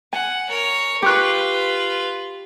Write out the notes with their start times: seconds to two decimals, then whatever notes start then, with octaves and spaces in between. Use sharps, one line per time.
0.13 F#5 G#5
0.49 A#4 C#5
1.02 F4 G4 B4 C#6 F#6